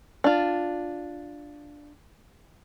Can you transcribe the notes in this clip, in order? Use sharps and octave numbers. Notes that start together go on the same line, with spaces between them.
D4 F4